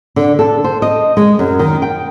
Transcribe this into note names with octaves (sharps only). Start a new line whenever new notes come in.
D3
A4
C5
D#5
G#3
F#2
D#3
G5